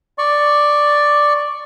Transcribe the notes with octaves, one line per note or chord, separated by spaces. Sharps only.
D5 C#6